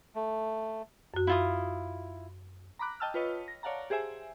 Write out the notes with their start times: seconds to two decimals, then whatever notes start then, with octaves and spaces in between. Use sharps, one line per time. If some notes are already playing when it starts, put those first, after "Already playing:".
0.15 A3
1.14 F#2 F#4
1.27 E4 F4 D#6
2.79 A#5 B5 D6 F#6
3.00 D#5 G5 A5 E6 F6
3.14 F4 B4 C#5 D#5
3.48 A#6
3.63 C#5 D5 F5 F#5 A5 A#5
3.90 G4 G#4 C5 E5 G#5